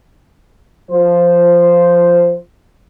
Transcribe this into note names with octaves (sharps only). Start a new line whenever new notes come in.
F3 C5